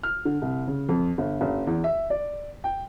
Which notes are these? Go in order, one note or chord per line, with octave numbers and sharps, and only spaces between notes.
F6
D3
C2
C#3
F2
G1
F#1
E2
E5
D5
G5